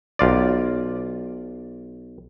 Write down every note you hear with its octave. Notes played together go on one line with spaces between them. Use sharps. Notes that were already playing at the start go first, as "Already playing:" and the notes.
B1 F4 D5